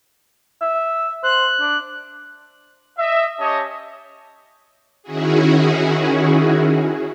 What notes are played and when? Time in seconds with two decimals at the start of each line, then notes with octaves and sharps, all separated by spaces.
0.61 E5
1.23 C5 F#6
1.60 D4
2.97 D#5 E5
3.39 C#4 G4 C#5 D#5 A5
5.03 D#3 C#4 E4 F#4 G#4